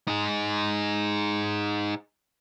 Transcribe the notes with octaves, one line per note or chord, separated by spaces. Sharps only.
D#4 G#4